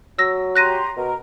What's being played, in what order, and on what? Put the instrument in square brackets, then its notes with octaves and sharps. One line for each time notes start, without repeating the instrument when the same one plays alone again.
[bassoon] F#3 [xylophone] E6 A#6
[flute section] G4 A#5 C6 [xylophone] F#6 A#6 D#7
[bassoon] B2 [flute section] A#4